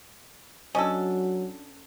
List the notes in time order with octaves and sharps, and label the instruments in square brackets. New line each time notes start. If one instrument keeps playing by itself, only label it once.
[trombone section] F#3 [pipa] C#4 A4 [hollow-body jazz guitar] D4 D#5